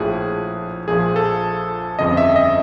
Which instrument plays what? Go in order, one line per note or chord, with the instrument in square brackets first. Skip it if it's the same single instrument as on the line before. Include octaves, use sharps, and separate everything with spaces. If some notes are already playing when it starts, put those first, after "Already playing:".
Already playing: [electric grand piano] A#1 A2 F3 G#4
A#1 A#2 F3 G#4
A4
G1 F2 C#3 D#5
E5
D#5